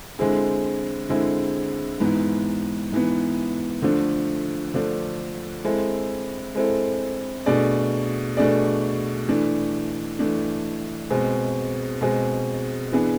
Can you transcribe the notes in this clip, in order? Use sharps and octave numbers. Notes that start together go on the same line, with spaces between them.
D3 G#3 C4 E4 G#4
D3 G#3 C4 E4 G#4
G#2 E3 B3
G#2 E3 B3
D3 F3 A3 D4
D3 F3 A3 D4
G#3 C4 E4 A4
G#3 C4 E4 A4
B2 A3 D4 G#4 D5
B2 A3 D4 G#4 D5
E3 A3 D4
E3 A3 D4
B2 G#3 C4 G#4
B2 G#3 C4 G#4
E3 B3 D4 G#4